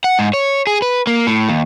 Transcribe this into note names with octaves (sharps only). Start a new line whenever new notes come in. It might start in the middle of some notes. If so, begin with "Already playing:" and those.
F#5
G#2
C#5
G#4
B4
A#3
A2
D#2